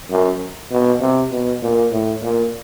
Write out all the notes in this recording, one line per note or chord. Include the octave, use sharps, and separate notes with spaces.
F#2
B2
C3
B2
A#2
A2
A#2